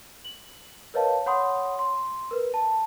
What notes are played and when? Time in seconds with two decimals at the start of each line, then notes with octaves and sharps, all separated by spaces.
0.24 F#7
0.94 A#4 B4 C#5 D#5 F5 A5
1.26 C#5 F#5 B5 C6 D#6
1.79 C6
2.31 A#4 B4
2.54 A5